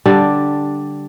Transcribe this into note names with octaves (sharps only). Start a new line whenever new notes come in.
D3 G3 D4